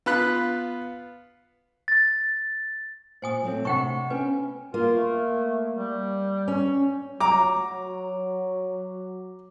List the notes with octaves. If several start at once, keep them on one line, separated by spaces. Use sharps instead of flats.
B3 F4 B5 F#6
A6
A#2 C5 G#5 D#6
F#3 A3 C4
C3 D4 F#5 G5 A5 C#6
B3 C#4 B4 G5
A#3 F4
A3
G3
C#4
F#3 A#5 D6